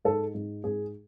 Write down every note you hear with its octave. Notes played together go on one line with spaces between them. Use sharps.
G#2 A4
G#2
G#2 G#4